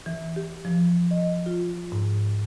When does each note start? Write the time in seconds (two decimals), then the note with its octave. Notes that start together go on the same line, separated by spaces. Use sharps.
0.06 E3
0.36 G4
0.65 F3
1.11 D#5
1.46 F4
1.92 G#2